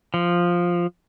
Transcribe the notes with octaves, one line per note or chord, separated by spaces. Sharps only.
F3